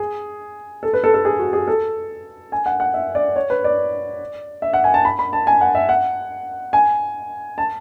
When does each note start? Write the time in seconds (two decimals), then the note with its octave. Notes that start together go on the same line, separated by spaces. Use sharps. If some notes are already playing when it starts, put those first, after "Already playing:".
Already playing: G#4
0.83 A4
0.93 B4
1.04 A4
1.14 A4
1.25 G#4
1.39 F#4
1.53 G#4
1.68 A4
2.52 G#5
2.66 F#5
2.80 F#5
2.94 E5
3.15 D5
3.36 C#5
3.50 B4
3.64 D5
4.62 E5
4.73 F#5
4.84 G#5
4.94 A5
5.05 B5
5.19 B5
5.33 A5
5.47 G#5
5.61 F#5
5.75 E5
5.89 F#5
6.73 G#5
7.58 A5